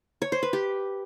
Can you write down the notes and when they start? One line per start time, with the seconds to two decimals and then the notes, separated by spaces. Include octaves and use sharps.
0.22 C#5
0.32 C5
0.43 B4
0.53 G4